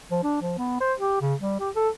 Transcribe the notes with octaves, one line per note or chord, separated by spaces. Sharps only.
F3
D4
F3
B3
C5
G4
C#3
G3
G4
A4